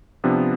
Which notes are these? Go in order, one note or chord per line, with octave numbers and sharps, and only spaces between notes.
C3 F3 B3 D4